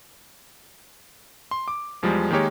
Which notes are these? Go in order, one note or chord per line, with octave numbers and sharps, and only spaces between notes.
C6
D6
E2 F3 G3 G#3
D#3 G#3 A#3 G4 C#5